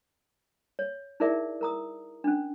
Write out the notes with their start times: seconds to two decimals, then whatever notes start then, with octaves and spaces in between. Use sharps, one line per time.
0.79 C#5
1.20 D#4 E4 G#4 A#4 D5 E5
1.61 A#4 A#5 D#6
2.24 C#4 D4